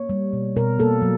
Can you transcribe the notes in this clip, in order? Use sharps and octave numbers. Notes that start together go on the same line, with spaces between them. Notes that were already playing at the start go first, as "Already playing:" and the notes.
Already playing: A#3 C#5
G3
B2
B2 A#4
A#3 A4
F#3